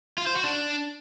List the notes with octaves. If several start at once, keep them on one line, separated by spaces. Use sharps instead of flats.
F4
C5
F#4
D4